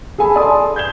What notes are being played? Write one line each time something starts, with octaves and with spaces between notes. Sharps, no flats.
G#4 A4 G#5 B5
D5 A5 C6 D#6
G6 G#6 E7 G7